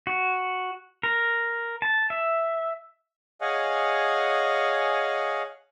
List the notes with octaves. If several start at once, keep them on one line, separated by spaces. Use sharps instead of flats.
F#4
A#4
A5
E5
G#4 C#5 D#5 F5 F#5 G#5